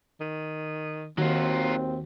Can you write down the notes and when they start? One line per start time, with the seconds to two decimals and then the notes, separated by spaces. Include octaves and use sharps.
0.20 D#3
1.18 D#2 D#3 F#3 C4 F4 F#4